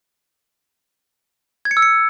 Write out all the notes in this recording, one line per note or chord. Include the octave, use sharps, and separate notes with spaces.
G#6
C#7
E6
C#7